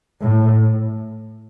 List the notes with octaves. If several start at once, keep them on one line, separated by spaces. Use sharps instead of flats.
A2